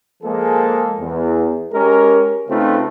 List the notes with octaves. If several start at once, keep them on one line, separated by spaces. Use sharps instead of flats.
F3 G#3 A#3 G#4 A4 C5
E2
G#3 C#4 G4 A#4
C#3 A3 C4 D#4 F4 B4